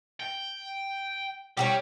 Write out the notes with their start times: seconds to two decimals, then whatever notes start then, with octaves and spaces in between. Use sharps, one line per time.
0.20 G5
1.57 G3 G4 A4 C#5